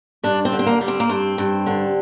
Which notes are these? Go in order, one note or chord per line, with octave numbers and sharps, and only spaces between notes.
G2 D4
C4
D3
C4
A#3
G3
C4
A#3
G2 C4
G2
D3